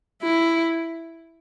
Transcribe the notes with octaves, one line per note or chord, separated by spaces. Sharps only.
E4